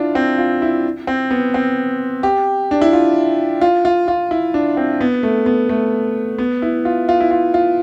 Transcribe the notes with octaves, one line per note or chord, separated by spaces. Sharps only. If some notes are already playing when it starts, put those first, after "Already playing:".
Already playing: D4 E4 F4
C4
F4
E4
C4
B3
C4
G4
D4
E4
F4
F4
F4
F4
E4
D4
C4
B3
A3
B3
A3
B3
E4
F4
F4
E4
F4
F4